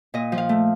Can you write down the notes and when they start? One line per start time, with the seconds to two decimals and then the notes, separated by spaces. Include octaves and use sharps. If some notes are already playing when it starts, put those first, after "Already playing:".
0.14 A#2 D#5
0.32 F3
0.38 F5
0.49 A3